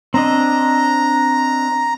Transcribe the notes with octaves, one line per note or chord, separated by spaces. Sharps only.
C4 D4 D#5 A#5